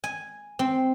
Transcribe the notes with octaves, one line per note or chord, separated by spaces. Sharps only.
G#5
C4